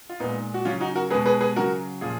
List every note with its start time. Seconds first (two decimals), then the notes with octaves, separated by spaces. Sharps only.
0.09 F4
0.20 A#2 G#3 B3 D#4
0.54 F#4
0.65 C#3 F#3 C#4 F4
0.80 D#4 F#4
0.96 F#4 A#4
1.10 B2 G#3 G#4 B4
1.26 G#4 B4
1.41 G#4 B4
1.56 C#3 F#3 F#4 A#4
2.01 A#2 F3 F4 G#4